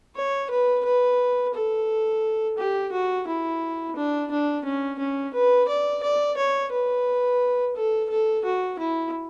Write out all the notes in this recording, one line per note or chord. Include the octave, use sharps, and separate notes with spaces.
C#5
B4
B4
A4
G4
F#4
E4
D4
D4
C#4
C#4
B4
D5
D5
C#5
B4
A4
A4
F#4
E4